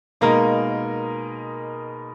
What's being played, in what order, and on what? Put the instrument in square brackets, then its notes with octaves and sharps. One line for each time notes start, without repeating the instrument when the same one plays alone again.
[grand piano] B2 G#3 D#4 A#4 [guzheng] A#3